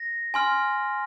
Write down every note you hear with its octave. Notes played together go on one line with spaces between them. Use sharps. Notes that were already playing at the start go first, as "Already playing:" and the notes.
Already playing: A#6
G#5 C6 F6